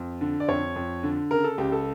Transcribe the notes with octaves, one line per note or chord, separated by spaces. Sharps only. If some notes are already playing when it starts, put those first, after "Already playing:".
Already playing: F2
D3
D5
F2 C#5
F2
D3
C#3 A#4
A4
C#2 G4
A4